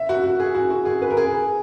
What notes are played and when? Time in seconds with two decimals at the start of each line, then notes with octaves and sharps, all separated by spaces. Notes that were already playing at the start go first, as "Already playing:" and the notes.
Already playing: E5
0.09 F#4
0.24 F#4
0.40 G#4
0.55 F#4
0.70 F#4
0.85 G#4
1.02 B4
1.11 A#4
1.17 G#4